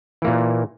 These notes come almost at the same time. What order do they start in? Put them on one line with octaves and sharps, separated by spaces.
E3 A#3 A#2